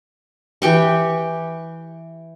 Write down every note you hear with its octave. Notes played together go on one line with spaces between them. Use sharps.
E3 G4 G5 C#6